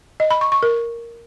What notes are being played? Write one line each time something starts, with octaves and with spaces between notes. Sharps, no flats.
D#5
B5
C#6
C#6
A#4